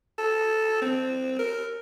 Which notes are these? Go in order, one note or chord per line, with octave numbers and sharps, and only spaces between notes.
A4
C4
A#4